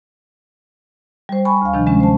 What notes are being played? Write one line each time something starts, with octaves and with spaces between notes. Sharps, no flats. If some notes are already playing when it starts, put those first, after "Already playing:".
G3 C5
G#5 B5 C#6
D2 F5
C3 D#3 F3 D4
G#3 C#4
C5 A5